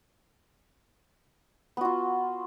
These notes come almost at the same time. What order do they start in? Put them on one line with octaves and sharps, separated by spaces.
B3 F#4 F4